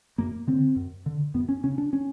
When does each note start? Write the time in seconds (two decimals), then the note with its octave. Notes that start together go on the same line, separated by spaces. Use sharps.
0.18 F#2 A#3
0.47 D3 C4
0.76 F#2
1.06 D3
1.34 F#2 B3
1.49 C#4
1.64 C#3 C#4
1.78 D4
1.93 C#4